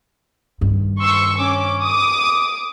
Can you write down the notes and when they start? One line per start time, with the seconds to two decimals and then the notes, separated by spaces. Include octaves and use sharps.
0.61 G2 D#3
1.00 C6 C#6 E6
1.39 C#4 D6
1.83 D6 D#6